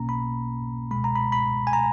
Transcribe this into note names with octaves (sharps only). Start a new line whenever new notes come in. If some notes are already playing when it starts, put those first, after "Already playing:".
Already playing: B1 B2 A#3 C#4 A#5
B5
C#2 B2 G#3 B5
A#5
B5
B5
G#5
A#5